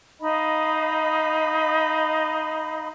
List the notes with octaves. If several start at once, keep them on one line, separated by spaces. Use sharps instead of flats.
D#4 D#5 F5 B5